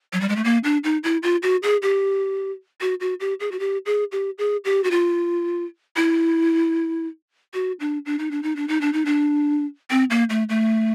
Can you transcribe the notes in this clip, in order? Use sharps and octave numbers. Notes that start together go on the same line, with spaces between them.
F#3
G3
G#3
A3
A#3
D4
D#4
E4
F4
F#4
G#4
G4
F#4
F#4
G4
G#4
F#4
G4
G#4
G4
G#4
G4
F#4
F4
E4
F#4
D4
D4
D#4
D4
D#4
D4
D#4
D4
D#4
D4
C4
A#3
A3
A3